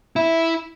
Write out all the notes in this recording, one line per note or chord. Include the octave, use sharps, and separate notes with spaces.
E4